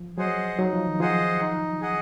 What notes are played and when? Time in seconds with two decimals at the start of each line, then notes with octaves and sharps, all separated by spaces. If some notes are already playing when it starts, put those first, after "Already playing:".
Already playing: F3
0.18 F#3 G#4 C5 D#5 F#5
0.59 F#3 D#4
0.73 F3
0.87 D#3
1.00 F3 G#4 C5 D#5 F#5
1.40 D#4
1.81 G#4 D#5 F#5